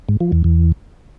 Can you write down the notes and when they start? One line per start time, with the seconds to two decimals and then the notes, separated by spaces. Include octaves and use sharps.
0.09 G#2
0.20 F3
0.32 E2
0.44 E2